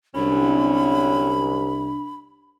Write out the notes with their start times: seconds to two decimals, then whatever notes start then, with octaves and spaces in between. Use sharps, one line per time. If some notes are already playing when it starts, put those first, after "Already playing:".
0.15 C2 D3 F#3 C#4 D4 B5